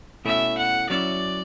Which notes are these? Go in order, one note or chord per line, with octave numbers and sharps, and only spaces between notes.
B2 A3 C#4 E4 E5
F#5
F#3 C#4 E4 D5